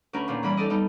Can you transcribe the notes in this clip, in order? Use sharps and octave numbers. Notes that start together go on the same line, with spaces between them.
D2 C#4 A#4 B4
D#2 A#2
E2 E3 G3 B5
D#4 A4 D5 D#5
G3 B3 D#4 A4